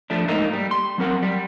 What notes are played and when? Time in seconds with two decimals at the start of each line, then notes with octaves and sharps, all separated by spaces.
0.10 F3 A3 D4
0.28 G#2 A3 A#3 D#4
0.53 G3
0.71 C6
0.98 F#3 C4 A#4 F#5
1.23 G3